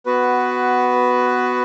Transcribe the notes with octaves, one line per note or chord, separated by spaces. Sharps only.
B3 F#4 B4